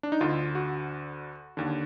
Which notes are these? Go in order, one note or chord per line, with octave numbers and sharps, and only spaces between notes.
D4
D#4
D2 D3 F4
F#4
D#2 D3